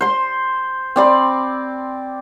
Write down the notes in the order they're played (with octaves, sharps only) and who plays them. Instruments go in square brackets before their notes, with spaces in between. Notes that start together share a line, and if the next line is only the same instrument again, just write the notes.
[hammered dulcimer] C5 C6
C4 D5 B5